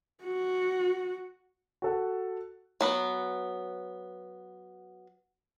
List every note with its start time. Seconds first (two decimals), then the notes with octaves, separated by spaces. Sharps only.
0.23 F#4
1.82 F#4 A4 F#5
2.81 F#3 B3 B4